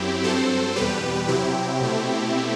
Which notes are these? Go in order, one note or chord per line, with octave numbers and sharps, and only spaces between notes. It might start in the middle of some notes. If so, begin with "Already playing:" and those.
Already playing: F#2 F#3 C4 E4 G4
G2 F#3 C4 A4 C5
E2 B2 G3 G4 B4
C3 F#3 C4 E4 G4
B2 A3 C4